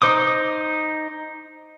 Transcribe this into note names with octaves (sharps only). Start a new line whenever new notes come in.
D#4 C5 D6 D#6